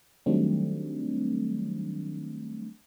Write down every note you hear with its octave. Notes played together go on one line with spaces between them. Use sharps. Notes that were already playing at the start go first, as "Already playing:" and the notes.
D#3 F#3 G3 A3 C4 D4